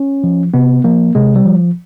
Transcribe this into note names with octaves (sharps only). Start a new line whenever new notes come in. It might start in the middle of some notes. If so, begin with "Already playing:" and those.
Already playing: C#4
F3
C3 B3
F3 A#3
C3 G#3
G3
F3